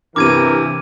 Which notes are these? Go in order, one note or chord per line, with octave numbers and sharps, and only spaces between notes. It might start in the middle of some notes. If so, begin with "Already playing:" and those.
G2 C3 E3 A#4 D6 G#6 D#7